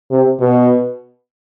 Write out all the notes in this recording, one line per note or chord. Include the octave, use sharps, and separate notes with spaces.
C3
B2